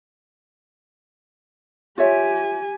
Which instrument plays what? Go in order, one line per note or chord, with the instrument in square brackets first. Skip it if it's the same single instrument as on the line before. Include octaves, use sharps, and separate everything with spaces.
[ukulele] F4 C#5 E5 [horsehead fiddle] G4 G#5